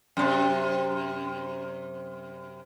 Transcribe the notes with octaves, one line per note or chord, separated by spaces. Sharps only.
F#2 C3